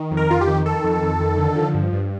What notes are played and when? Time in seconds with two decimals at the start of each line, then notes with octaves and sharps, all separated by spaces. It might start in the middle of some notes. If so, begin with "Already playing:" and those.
Already playing: D#3
0.11 F2
0.17 A#4
0.30 F2 F4
0.41 G4
0.47 D#3
0.66 D#3 A4
0.84 F2
1.02 F2
1.20 D#3
1.38 D3
1.56 F3
1.74 G2
1.93 G2